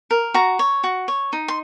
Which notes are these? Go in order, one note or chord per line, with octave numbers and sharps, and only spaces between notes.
A#4
F#4 A#5
C#5
F#4
C#5
D#4
C6